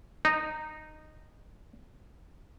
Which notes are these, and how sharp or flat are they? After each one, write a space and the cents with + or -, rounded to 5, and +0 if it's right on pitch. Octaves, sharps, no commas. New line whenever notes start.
D#4 -15